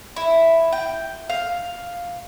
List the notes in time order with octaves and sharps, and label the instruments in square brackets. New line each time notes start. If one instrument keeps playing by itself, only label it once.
[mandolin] E4
G5
F5